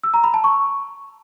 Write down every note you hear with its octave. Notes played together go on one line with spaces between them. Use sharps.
E6
A#5
B5
A5
C#6